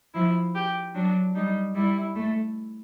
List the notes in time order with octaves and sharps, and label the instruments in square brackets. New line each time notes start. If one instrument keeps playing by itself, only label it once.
[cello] F3 [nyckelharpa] E4
[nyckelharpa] G4
[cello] F#3 [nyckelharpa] D4
[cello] G3 [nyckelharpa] D#4
[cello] G3 [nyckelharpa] E4
[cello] A3